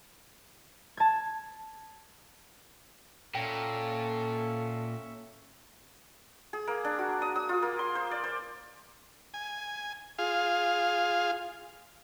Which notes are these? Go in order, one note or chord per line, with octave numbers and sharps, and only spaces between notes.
A5 G#6
A#2 C#4 A4 E5 G5
G#4
A#3
D4
F#4
D#6
D#6
F4
A#3
C6
C5
D5
C5
G#5
F4 G#4 F5